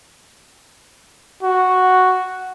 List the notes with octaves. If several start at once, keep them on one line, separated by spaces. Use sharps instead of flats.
F#4